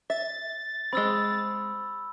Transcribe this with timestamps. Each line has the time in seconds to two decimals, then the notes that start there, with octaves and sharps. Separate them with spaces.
0.10 E5 A6
0.93 G#3 C4 B5 E6